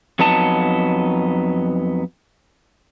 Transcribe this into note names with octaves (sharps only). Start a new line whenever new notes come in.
F2 F#3 B3 D#4 A5